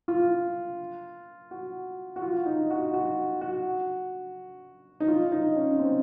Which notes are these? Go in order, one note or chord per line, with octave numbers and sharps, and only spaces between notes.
F4
F#4
F#4
F4
D#4
F#4
F#4
F#4
D#4
F4
D#4
C#4
C4